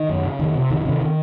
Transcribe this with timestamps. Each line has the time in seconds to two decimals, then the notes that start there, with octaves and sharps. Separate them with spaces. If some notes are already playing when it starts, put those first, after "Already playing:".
Already playing: D#3
0.09 F#2
0.24 C#3
0.39 F2 D#3
0.55 C3
0.70 F2 D#3
0.82 E3
0.85 C3 D#3
1.01 D#3